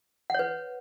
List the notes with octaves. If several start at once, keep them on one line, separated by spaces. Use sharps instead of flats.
B4 C#5 F#5